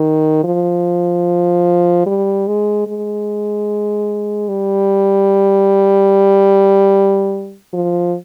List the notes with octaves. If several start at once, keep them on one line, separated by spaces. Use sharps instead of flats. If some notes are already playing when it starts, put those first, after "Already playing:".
Already playing: D#3
F3
G3
G#3
G#3
G3
F3